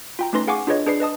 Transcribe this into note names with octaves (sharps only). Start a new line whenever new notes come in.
F4 G5 A#5
A3 C#4 D#4 B4 C6 A#6
G#4 F5 F#5 G#5 C#6 D6
D4 F4 G#4 B4 C#5 D#5
D4 G#4 B4 D5 C7
B4 D#5 A5 D#6